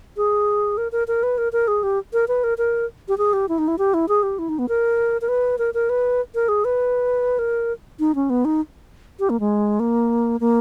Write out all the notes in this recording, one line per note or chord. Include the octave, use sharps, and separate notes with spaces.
G#4
A#4
A#4
A#4
B4
A#4
A#4
G#4
G4
A#4
B4
A#4
A#4
G4
G#4
G4
E4
D#4
E4
G4
E4
G#4
G4
E4
D#4
B3
A#4
A#4
B4
A#4
A#4
B4
A#4
G#4
B4
A#4
D#4
C#4
B3
D#4
G4
A#3
G#3
A#3
A#3